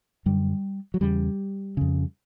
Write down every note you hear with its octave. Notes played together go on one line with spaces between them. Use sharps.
F#2 D3 G3
F#3
E2 C#3 G3
F2 C#3